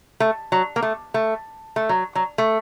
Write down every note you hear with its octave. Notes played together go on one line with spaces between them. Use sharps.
A3
F#3
A#3
A3
A3
A3
F#3
F#3
A3